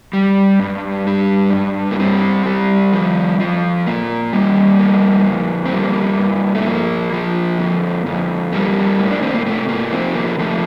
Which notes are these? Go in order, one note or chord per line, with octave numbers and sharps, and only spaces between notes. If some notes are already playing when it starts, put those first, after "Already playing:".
G3
G2
G3
G2
A#3
G3 C4
G3
F3
F3
A#2 A#3
G3
F2 A#3
F2
C4
G3 A#3
G2
A3
F3 A#3
F3
F2
F2
G3 A#3
A2
D4
C4
A#3
C3 A3
A#3
F3 C4
A#3
F3 A3